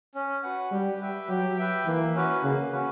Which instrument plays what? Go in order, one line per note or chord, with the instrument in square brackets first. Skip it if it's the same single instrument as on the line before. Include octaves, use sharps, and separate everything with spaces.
[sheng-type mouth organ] C#4
F#4 B4 F#5
[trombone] G3 [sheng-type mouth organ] G4
[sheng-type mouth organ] B4 E5 G5
[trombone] F#3 [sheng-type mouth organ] G4
[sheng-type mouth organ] B4 E5 G5
[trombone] E3 [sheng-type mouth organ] A#3
[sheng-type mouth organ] C#4 F#4 B4
[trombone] C#3 [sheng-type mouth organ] A#3
[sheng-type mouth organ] C#4 F#4 B4